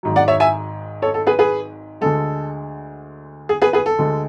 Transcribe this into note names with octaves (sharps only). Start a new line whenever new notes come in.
G#1 G#2 F#3
D5 F#5
C#5 E5
E5 G#5
A4 C#5
A4
G#4 B4
G#4 B4
D2 D3 G#3 A4
G#4
G#4 B4
G#4 B4
A4
D2 D3 G#3